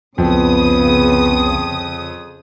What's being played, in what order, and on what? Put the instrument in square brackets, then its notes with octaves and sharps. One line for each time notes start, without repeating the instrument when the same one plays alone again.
[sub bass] C2 [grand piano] F2 [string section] C#3 D#6 [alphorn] B3